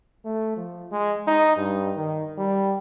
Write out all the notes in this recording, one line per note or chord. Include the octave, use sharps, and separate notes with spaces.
A3
F3
G#3
D#4
G2
D#3
G3